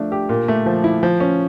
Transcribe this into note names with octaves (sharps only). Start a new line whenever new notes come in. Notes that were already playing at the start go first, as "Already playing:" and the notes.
Already playing: F3 A3 D4
G4
A#2
A3
F3
E4
F3
C#4